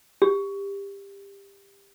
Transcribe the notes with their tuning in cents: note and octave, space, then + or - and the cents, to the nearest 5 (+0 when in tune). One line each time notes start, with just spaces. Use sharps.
G4 +20